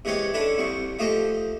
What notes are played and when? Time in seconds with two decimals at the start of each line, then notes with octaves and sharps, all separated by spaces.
0.05 C3 E3 G#3 C#5 G5 D6
0.34 D3 C#4 D4 E4 A4
0.58 C2 C3 C#6
0.99 F3 A3 F4 G4 D#5